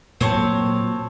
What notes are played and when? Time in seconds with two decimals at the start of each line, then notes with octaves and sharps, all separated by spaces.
0.21 A#2 F#3 C4 C#5 A5